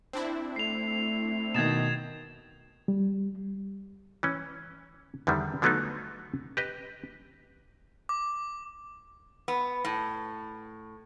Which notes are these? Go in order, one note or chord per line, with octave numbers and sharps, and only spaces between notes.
C4 D4 E4
A3 C7 F7
B2 D#3 G#6 A6 E7
G3
E3 C#4
E2 D3 D#3 G3
D3 F3 F#3 A3 B3 D#4
G4 B4 D#5
D6
B3
A2